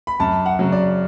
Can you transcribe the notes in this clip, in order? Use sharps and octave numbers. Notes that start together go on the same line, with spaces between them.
B5
F#2 A5
F#5
C#3 F#3
D5